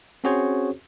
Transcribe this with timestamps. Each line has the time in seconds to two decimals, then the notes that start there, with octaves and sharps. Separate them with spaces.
0.24 C4 C#4 F#4 G#4 C5 C#5